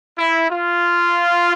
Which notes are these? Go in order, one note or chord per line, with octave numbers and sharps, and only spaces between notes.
E4
F4